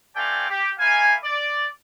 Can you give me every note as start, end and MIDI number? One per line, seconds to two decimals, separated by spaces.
0.16 0.49 57
0.16 0.49 60
0.16 0.49 74
0.16 0.49 77
0.16 0.49 79
0.16 0.49 80
0.49 0.71 67
0.79 1.14 58
0.79 1.14 64
0.79 1.14 77
0.79 1.14 80
1.24 1.66 74